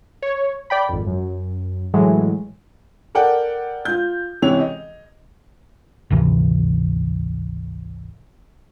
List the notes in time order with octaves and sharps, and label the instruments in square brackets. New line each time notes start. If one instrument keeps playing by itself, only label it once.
[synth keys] C#5
D5 G5 B5
G#1 F2
F#2
A2 E3 F#3 G#3
[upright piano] A4 A#4 D5 F#5 G5
F4 G6
C#2 C3 E3 C#5 F7
D#5
[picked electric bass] G#1 D2 C3 E3